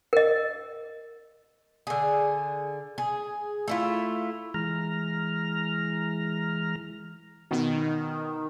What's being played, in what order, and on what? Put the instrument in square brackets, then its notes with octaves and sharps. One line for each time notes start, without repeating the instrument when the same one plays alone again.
[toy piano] A#4 D#5
[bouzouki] D3 G#4
G#4
A3 E4 F4
[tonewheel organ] E3 G#3 A#5 F6
[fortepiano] B2 [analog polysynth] D#3